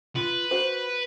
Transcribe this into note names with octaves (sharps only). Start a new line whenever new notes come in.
F4 B4
F#4 C5